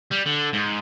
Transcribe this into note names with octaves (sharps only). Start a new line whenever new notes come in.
G3
D3
G#2